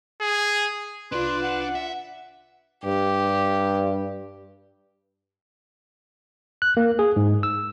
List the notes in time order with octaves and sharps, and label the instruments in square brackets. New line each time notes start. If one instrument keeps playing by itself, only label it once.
[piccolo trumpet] G#4
[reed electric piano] C2 F4 [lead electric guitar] D4 D5 [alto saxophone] B4 [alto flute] C6
[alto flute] F#5
[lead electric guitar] E5
[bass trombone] G2 [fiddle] G4
[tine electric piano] F#6
A#3
G#4
G#2
E6